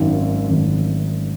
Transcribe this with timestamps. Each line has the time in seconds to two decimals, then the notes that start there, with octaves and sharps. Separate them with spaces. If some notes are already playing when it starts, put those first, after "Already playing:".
Already playing: G#1 F#2 D#3
0.50 G#1 F#2 D#3